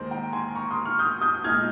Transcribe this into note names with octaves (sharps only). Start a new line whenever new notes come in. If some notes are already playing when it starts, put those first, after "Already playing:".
Already playing: D#2 D#3 G#3 A#4 C5
G5 A#5
G#5 C6
A#5 C#6
C6 D#6
C#6 F6
D#6 G6
D#6 G6
A#2 G#3 D#4 F6 G#6